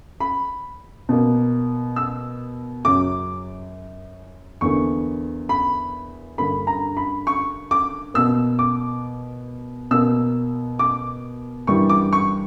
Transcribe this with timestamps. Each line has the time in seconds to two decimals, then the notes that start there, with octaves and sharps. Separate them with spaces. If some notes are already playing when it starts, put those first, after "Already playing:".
0.20 B5
1.09 B2 A#3
1.96 E6
2.85 F#2 C#3 F#3 D6
4.61 E2 D3 A#3 C#6
5.49 B5
6.38 G2 D3 A#3 B5
6.67 A#5
6.97 B5
7.27 C#6
7.71 D6
8.14 B2 A#3 E6
8.59 D6
9.91 B2 A#3 E6
10.79 D6
11.67 G2 E3 G3 A#3 C#6
11.90 D6
12.13 C#6